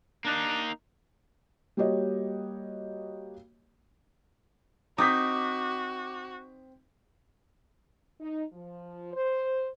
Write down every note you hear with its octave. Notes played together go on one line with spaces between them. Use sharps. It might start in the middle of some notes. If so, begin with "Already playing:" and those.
A#3 D4 D#4
G3 A#3 F#4 G4 C#5 D#5
C4 D#4 F#4 D6 G6 B6
D#4
F3
C5